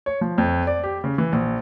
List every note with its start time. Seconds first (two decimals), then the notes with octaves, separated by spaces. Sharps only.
0.06 C#5
0.21 F3
0.38 F2
0.67 D5
0.84 G4
1.04 C#3
1.18 E3
1.32 A#1